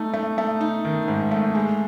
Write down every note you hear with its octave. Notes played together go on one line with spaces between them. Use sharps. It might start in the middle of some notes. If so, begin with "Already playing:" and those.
Already playing: A3 D#4
A3
A3
D#4
D#3
G#2
A3
G#3